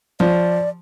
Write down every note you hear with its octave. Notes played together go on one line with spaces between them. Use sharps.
F3 D5